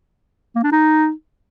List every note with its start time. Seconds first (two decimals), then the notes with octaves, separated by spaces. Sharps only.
0.55 A#3
0.64 D4
0.72 D#4